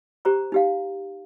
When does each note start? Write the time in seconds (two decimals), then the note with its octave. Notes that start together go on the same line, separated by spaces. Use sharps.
0.25 G4 C5 A#5 C#6
0.52 D#4 G4 F5